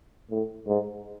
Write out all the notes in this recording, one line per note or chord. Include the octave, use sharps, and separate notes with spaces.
A2
G#2